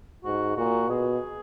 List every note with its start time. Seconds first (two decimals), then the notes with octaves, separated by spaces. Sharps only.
0.25 G#2 F#4
0.56 A#2 F#4
0.88 B2 G#4